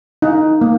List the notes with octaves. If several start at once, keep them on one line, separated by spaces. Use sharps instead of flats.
D#4
A#3